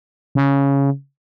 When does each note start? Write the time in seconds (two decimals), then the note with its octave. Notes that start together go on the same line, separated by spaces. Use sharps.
0.35 C#3